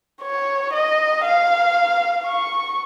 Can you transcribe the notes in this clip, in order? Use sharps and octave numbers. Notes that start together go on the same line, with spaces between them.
C#5
D#5
F5
C#6